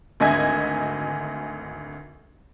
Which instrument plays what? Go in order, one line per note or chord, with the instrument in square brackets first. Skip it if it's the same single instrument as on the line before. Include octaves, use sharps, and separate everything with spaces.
[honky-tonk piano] G#1 D2 D#5 E5 G#5 G#6